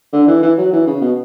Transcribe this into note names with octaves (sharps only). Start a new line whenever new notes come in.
D3
E3
E3
F#3
E3
C#3
B2